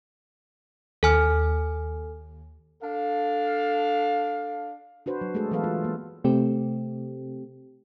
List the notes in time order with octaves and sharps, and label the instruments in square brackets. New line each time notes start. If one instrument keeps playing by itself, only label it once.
[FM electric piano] D#2 [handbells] A4 G#5 F6
[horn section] D4 A4 F5
[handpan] D4 F#4 B4 C5
F#3
G#3 A3 F#4 G#4 A4
E3 F#3 B3 A4 B4 F5
F4
A#3
[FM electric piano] C3 A3 C4 G4